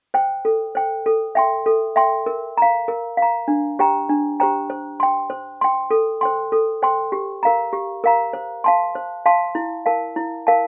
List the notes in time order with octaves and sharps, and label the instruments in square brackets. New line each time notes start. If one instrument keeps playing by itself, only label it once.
[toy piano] C5 G5
A4
C5 G5
A4
E5 G5 C6
A4
E5 G5 C6
A#4
F5 A#5
A#4
F5 A#5
D4
G4 C5 G5 A#5
D4
G4 C5 G5 A#5
C5
G5 C6
C5
G5 C6
A4
C5 G5 C6
A4
C5 G5 C6
G4
A#4 F5 A#5
G4
A#4 F5 A#5
C5
F5 A5 C6
C5
F5 A5 C6
E4
A#4 F5 A5
E4
A#4 F5 A5